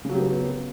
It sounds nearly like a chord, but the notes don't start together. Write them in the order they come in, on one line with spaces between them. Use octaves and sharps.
C#3 F#3 G4 B3